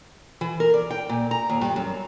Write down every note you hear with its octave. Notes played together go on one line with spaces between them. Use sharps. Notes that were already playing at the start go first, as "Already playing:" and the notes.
E3
A#4
D5
G5
A#2
A#5
D#2
G2
F#2